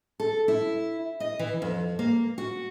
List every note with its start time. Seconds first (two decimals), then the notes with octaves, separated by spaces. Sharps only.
0.20 A4
0.48 E4
1.20 D#5
1.39 E3
1.62 F2
1.99 A#3
2.38 F#4